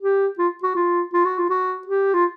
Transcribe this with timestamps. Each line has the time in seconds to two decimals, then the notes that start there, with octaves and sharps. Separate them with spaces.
0.01 G4
0.39 F4
0.63 F#4
0.76 F4
1.14 F4
1.25 F#4
1.38 F4
1.50 F#4
1.87 G4
2.14 F4